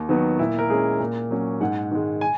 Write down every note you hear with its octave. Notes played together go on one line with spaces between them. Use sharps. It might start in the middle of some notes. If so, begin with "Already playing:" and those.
Already playing: D#2
D#3 F#3 B3
A#2 E4
A#4
G#3 C#4 G#4
A#2
F#3 A#3 C#4
G#2 F#5
D#3 G#3
G#5